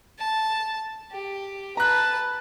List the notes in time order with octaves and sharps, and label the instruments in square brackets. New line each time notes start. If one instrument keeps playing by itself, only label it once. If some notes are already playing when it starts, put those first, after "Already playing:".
[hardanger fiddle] A5
G4
[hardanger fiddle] B4 A5 [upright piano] A#5 F#6